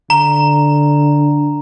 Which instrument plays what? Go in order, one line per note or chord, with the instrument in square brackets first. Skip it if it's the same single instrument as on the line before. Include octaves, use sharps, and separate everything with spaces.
[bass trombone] D3 [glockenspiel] A#5